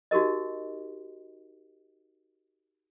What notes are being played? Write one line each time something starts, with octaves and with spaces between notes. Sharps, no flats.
D#4 F#4 G4 A#4 D#5